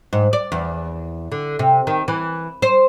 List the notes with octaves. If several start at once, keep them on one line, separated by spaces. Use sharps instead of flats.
G#2
D5
E2
D3
C3
D#3
E3
C5